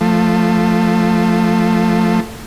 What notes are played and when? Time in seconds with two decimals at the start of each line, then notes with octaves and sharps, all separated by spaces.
0.01 F3 A3